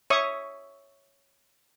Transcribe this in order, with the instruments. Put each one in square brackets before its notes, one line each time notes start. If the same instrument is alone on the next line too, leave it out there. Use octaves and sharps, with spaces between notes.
[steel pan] C#5 E5 C#6 D#6